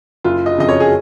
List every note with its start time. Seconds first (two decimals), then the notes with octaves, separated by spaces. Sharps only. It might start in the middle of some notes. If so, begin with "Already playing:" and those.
0.24 F#1 F4
0.46 D#5
0.58 F2 C#3 D#5
0.69 C#5
0.80 G#4